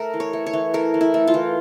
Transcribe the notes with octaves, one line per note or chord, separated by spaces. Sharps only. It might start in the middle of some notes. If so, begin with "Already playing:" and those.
Already playing: A3 A#4
E3
C#5
A3
C#5
E3
A3 A#4
E3
E4
A3
F4
E3